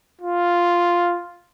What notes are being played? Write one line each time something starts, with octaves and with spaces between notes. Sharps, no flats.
F4